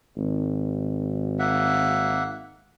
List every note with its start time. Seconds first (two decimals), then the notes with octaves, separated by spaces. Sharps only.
0.16 G#1
1.39 A#3 E5 F#5